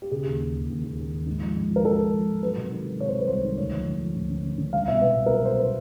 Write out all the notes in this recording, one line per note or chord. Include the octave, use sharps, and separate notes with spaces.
G4
C#3 G#4
D#2
D#2
D#2
D#2
D#2
D#2
D#2
G#2
F3
G#2
F3
A#4
F3 A4
F3
F3
G#2
F#3 B4
C3
D#3
F#3
C3 C#5
C5
F#3 B4
C2 C5
D#3
D2 C#5
F3
D2
F3
D2
D3
D2
D3
C2 F5
B2 E5
C2 B4
B2
A#4
F#3 B4
B2 C5
B4